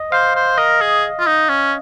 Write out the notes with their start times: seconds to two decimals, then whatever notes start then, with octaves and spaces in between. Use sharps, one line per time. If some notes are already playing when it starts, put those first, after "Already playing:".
Already playing: D#5
0.12 C5 F5
0.36 C5
0.58 A#4 D#5
0.81 G#4
1.19 F4
1.27 D#4
1.50 C#4